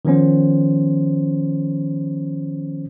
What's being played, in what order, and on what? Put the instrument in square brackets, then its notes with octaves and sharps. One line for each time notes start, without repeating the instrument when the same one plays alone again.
[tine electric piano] D#3 F3 B3 C#4 C5